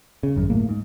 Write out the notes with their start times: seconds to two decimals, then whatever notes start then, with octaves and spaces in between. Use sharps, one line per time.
0.23 C#3
0.36 G#1 F#2
0.50 D1 A2 A#3
0.69 G#2